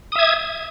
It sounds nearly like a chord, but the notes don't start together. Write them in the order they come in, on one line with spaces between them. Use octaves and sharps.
D#6 E5 G#6